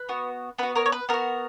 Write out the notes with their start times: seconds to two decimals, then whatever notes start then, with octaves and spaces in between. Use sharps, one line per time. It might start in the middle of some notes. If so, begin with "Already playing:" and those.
Already playing: B4
0.09 B3 F#4
0.58 B3 F#4 B4
0.75 A#4 C#5
0.86 C#5
0.92 B4
1.09 B3 F#4 A#4